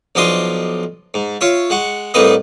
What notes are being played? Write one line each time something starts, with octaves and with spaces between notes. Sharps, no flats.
B1 F3 D4 D#5 C6
G#2
F4 C#5 E5
G#3 F#5 C#6
C2 A2 A#3 D#4 B4 D#5